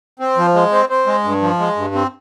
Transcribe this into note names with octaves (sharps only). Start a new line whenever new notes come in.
C4
F3
G#3
C4
C4
G#3
G2
F3
G#3
G2
C4